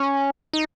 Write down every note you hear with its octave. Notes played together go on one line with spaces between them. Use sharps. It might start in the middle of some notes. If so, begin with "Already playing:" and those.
Already playing: C#4
D#4